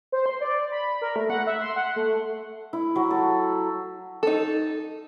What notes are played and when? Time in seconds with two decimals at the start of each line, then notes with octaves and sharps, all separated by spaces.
0.12 C5
0.26 C6
0.41 D5
0.72 B5
1.02 A#4
1.16 A3
1.30 F#5
1.47 E5
1.61 C6
1.76 F#5
1.96 A3
2.73 E4
2.96 F#3
3.11 A4
4.23 D#4 A4